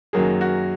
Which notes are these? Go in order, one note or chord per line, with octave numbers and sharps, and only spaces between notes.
F#2 D#3 F#3 A#3 G#4
F#4